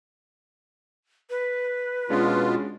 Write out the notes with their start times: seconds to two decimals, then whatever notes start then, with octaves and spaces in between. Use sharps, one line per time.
1.30 B4
2.10 B2 G#3 B3 C#4 D4 F4